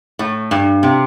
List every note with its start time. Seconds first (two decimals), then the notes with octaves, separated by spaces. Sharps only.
0.19 A2
0.51 G2
0.83 C3